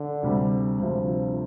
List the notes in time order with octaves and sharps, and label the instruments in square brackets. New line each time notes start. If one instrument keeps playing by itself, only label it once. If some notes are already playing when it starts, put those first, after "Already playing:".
Already playing: [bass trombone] D3
[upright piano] D2 C3 G3
[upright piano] D2 C3 G3 [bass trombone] F3
[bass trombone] F3